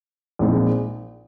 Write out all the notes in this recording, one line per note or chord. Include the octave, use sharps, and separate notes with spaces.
A#1 A#2 G#3 C4 D#4